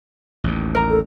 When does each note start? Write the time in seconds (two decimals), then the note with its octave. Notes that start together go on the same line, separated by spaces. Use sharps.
0.44 A1 D#2
0.75 A#4 A#5
0.90 A4